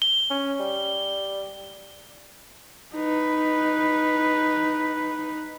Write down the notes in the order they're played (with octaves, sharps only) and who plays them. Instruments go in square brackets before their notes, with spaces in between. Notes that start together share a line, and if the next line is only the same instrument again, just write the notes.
[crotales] G7
[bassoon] C#4
G3
[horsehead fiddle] D#4 B4